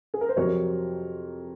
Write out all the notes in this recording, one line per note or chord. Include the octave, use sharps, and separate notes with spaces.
G#4
A#4
C5
F2 C3 F#3 C4 A#4 C#5